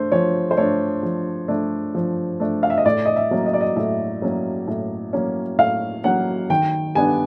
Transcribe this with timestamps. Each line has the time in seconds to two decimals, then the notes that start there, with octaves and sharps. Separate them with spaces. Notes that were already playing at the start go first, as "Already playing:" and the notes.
Already playing: A3 D4 C5
0.12 F3 C#5
0.51 C5
0.57 A3 D4 C#5
1.03 F3
1.48 A3 D4
1.95 F3
2.40 A3 D4
2.63 F5
2.70 E5
2.78 D#5
2.86 A2 D5
3.05 D#5
3.16 E5
3.31 F#3 A#3 C#4
3.46 D#5
3.54 D5
3.61 D#5
3.76 A2 E5
4.22 F#3 A#3 C#4
4.67 A2
5.13 F#3 A#3 C#4
5.58 A2 F5
6.04 F#3 A#3 C#4 F#5
6.50 D#3 G5
6.95 G3 B3 D4 G#5